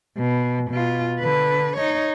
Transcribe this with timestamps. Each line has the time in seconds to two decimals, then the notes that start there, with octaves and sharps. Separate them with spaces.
0.17 B2
0.71 B2 F4
1.20 D3 B4
1.77 D#4 C#5